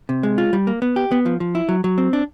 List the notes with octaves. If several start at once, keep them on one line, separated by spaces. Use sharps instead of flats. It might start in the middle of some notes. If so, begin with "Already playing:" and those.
C3
G#3
F4
G3
A#3
B3
G4
B3
F3
F3
E4
F#3
F#3
C4
D4